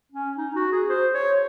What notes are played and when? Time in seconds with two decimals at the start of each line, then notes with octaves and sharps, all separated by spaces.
0.12 C#4
0.37 D#4
0.55 F#4
0.72 G#4
0.89 C5
1.14 C#5